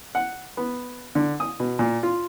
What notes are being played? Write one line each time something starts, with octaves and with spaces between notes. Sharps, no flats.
F#5
B3
D3
D#6
B2
A#2
F4